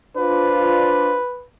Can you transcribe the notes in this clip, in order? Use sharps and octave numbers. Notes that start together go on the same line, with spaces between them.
D4 F4 B4 C5